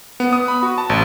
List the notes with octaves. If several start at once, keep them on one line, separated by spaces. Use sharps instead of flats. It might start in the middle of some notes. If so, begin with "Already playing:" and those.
B3
D#6
B5
F#4
A5
A1